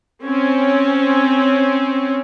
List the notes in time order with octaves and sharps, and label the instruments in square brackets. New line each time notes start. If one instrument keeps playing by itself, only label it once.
[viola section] C4 C#4